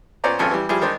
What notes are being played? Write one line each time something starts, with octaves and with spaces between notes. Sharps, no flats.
A#2 B3 C#4 C5 D5 A#5
G#1 F2 C#4 F4 A4
E3 G3
F3 G3 E4 G#4
D#3 G#3 D4 D#4 C5